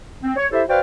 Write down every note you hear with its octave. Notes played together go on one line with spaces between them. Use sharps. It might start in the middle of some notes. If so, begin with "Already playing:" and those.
C4
C#5
E4 G4 A4 C5 E5
F#4 B4 C5 D5 F5 G5